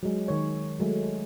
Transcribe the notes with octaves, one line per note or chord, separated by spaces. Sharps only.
F#3 G#3
D#3 C#5
F#3 G#3 A3